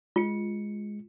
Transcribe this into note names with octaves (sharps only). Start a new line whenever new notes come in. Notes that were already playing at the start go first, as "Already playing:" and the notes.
G#3 F4 C#7